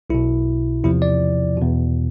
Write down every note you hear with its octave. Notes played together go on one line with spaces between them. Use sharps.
B1 B2 E4
E2 C3 F3 E4
D5
E2 B2